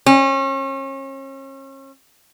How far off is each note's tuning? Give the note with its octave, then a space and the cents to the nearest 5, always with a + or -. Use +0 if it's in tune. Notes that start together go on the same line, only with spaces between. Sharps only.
C#4 -35